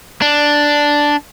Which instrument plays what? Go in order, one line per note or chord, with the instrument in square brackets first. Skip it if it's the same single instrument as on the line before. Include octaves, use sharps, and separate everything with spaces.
[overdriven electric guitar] D4